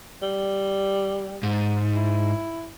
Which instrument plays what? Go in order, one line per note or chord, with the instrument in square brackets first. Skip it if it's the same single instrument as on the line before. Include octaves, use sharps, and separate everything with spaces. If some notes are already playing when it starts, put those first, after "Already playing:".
[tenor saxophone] G3
[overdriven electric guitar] G#2
[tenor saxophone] E4